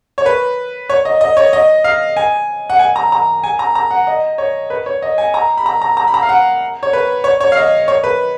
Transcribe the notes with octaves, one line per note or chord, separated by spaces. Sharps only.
C#5
B4
C#5
D#5
D#5
C#5
D#5
F5
G#5
F#5
G#5
A#5
A#5
G#5
A#5
A#5
F#5
D#5
C#5
B4
C#5
D#5
G#5
A#5
B5
A#5
A#5
A#5
B5
A#5
F5
F#5
C#5
B4
C#5
C#5
F5
D#5
C#5
B4